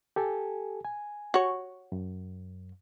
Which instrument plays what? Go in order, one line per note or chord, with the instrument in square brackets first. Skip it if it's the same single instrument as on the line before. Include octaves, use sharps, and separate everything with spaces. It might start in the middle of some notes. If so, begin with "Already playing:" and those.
[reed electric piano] G4 A4 G#5
G#5
[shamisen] F#4 C#5
[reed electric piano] F#2